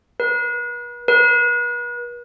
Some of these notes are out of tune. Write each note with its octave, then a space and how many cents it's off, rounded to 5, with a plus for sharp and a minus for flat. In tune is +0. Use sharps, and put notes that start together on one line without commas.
B4 -40
B4 -40